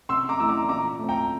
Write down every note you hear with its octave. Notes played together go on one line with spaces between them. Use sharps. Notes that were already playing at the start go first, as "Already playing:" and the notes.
C3 C6 E6
A#5 D6
E3 A3 E4 E6
A#5 D6
A#2 A#5 D6
A3 C4
G5 A#5